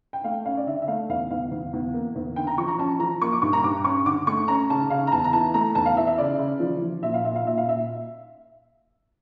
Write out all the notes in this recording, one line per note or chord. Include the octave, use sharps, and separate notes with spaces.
G5
A3 F5
C#4 F5
D5
D3 E5
E5
A3 F5
E2 F5
E2 F5
E2
E2
A#3
E2
D3 G5
A#5
F3 C#6
A#5
C#4 A5
F3 A#5
A#3 C#6
D6
G2 C#6
A#5
G2 D6
C#4 C#6
D3 D6
A3 C#6
C#4 A#5
C#3 A5
C#3 F5
A#5
E2 A5
A#5
E3 A5
A3 A#5
E2 A5
F5
E3 E5
E5
C#3 D5
C#3
F3
F3
A#2 E5
F5
A#2 E5
F5
A#2 E5
F5
A#2 E5